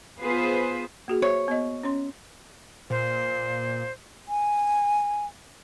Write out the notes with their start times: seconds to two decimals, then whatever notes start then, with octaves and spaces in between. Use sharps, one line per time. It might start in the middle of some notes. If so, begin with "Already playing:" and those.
0.21 B3 F4 G#4 B4 C5
1.08 A#3 F#4 G#4
1.22 C5 C#5 E5
1.48 B3 D#5
1.83 C#4 C#5 C6
2.90 A#2 C5
4.28 G#5